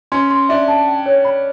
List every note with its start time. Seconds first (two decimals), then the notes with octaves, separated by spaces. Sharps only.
0.12 C#4 C6
0.31 C6
0.49 D4 E5
0.68 A5
0.87 G5
1.06 C#5
1.25 B5